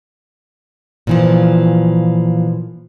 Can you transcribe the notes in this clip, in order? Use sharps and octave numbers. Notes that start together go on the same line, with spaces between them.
A#2 E3 F3